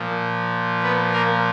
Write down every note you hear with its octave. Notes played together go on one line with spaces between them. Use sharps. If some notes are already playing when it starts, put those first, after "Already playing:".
Already playing: A#2 F3
B3 B4
A#3 A#4